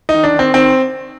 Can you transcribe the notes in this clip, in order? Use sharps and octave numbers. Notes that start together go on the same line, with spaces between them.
D#4
D#3
D4
D#3 C4
D#3 C4